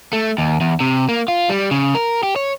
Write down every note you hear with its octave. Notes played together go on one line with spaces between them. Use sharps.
A3
D#2
E2
C3
A#3
F4
G3
C#3
A#4
G4
C#5